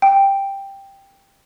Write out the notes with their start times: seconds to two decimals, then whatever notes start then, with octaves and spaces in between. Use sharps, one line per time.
0.02 G5